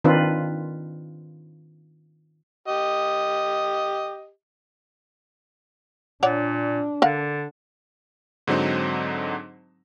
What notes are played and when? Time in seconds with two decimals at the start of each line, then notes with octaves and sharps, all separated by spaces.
0.04 D#3 C4 D4 F4 B4
2.68 G4 D#5
6.23 A#2 D4 C#5 D5 F#5
7.02 D3 A#4 F5 F#5
8.47 G#2 D3 F#3 C4 D#4